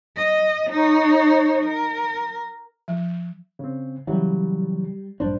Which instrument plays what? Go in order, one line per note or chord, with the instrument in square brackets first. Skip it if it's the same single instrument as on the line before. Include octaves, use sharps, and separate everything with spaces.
[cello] D#5
D#4 C#5
A#4
[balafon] F3
[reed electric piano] C#3 C4
[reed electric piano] C#3 E3 F#3 [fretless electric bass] G3
[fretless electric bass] A#1 G2 D4 [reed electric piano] C5